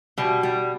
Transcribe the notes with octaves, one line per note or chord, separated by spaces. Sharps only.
B2 G3
G3